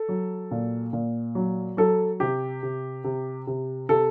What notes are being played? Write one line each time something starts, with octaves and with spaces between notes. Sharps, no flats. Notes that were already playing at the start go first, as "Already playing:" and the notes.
Already playing: A4
F#3
A#2
A#2
F#3
F#3 A4
C3 G4
C3
C3
C3
C3 A4